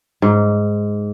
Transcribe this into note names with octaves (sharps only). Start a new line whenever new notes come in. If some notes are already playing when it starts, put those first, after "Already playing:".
G#2